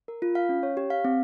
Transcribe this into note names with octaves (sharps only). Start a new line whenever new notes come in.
A#4
F4
F5
C#4
C#5
G4
F5
C4